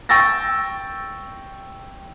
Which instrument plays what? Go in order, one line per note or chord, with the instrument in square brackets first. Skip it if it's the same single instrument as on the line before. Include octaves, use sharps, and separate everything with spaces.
[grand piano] G5 C#6 E6 A6 A#6